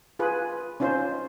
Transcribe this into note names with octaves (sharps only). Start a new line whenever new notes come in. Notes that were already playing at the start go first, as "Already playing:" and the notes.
F4 G#4 B4
C#4 D#4 F4 C5